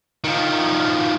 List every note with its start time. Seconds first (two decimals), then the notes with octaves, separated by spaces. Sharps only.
0.24 D#3 F3